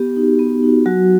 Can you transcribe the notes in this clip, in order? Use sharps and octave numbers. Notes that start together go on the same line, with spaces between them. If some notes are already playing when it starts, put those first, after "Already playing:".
Already playing: B3 G4
D#4 F#4
B3
D#4 F#4
F#3 F#4